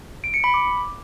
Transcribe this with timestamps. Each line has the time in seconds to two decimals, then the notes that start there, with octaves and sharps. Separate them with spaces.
0.24 D7
0.34 C#7
0.44 B5
0.54 D6